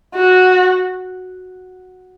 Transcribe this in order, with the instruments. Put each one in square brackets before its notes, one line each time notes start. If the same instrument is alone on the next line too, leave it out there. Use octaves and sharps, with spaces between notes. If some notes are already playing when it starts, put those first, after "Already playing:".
[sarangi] F#4